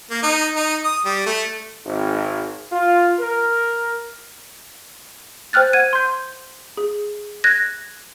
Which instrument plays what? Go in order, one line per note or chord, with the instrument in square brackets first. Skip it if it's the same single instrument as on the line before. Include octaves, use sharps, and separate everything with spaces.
[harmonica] A#3
D#4
D#4
D#6
G3
A3
[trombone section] G#1
F4
A#4
[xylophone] C5 G5 F6 F#6 A6
F#5 G#6 D#7
C6 G6
G#4
F#6 G#6 A#6